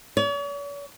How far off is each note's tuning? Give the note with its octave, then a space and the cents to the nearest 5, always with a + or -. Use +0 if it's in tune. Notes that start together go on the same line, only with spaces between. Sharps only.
C#5 +45